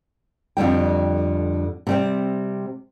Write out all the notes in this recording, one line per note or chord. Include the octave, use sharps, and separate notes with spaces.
F2 D3 G3 G5
C3 G3 C4